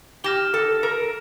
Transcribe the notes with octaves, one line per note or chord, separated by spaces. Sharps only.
G4 F6 A#6 E7 G7
A4
A#4